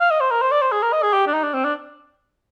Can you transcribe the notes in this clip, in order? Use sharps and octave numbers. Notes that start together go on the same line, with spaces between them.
F5
D#5
C5
A#4
C5
D5
C5
G#4
A#4
D#5
G#4
G4
D4
D#4
D4
C4
D4